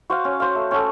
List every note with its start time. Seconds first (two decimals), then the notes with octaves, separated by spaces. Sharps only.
0.10 F#4 C5 F5
0.25 C#4
0.40 F#4 C5 F5
0.55 A3
0.71 C#4 F#4 A4